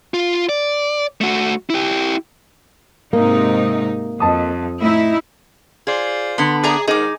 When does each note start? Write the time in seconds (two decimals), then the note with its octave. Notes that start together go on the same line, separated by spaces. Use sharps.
0.14 F4
0.49 D5
1.21 A3 F#4
1.70 E4 G4
3.13 G#2 C3 A#3 D#4
4.20 F2 D#5 A5 D#6
4.82 A2 D#4 E4
5.87 F4 G#4 C5 D5
6.38 D3 B3 C6
6.64 G#4 D5 E5 A#5
6.87 G#2 D#3 D#4 G#4 D6